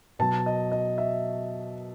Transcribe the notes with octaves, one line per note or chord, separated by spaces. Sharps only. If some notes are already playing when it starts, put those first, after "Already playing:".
B2 F#3 A5
D#5
D#5
E5